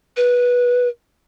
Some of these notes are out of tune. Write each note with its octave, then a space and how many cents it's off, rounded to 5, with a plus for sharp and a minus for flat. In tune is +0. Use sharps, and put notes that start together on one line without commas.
B4 -15